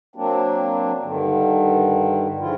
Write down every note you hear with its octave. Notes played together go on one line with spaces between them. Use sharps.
F#3 A#3 C4 D4
G2 D3 D#3
G2 D#3 F3 G#3 E4 F4